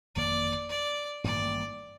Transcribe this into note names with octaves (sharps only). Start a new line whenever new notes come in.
G1 F2 D#3 A#3 D5
D5
A1 G2 D#3 A#3 D5